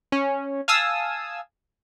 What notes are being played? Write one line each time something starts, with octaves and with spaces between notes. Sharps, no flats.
C#4
F5 G#5 A5 D#6 E6